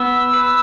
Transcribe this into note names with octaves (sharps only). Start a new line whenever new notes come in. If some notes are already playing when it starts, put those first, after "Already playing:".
Already playing: B3 E6
B4